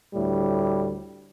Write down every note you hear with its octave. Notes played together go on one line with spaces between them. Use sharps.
D2 A2 G3